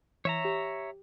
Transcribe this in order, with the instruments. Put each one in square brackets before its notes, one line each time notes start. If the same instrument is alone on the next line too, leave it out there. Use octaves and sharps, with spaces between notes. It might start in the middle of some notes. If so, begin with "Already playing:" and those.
[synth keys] E3 [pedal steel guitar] C#5 E5 A#5
[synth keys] G4